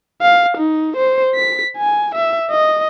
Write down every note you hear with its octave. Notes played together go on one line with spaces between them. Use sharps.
F5
D#4
C5
B6
G#5
E5
D#5